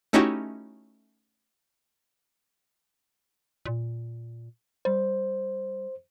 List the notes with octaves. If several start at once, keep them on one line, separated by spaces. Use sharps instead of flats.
A3 C#4 D#4 E4 F#4 G4
A#2
G3 C5